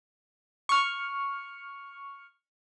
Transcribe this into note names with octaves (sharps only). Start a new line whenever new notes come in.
C#6 F6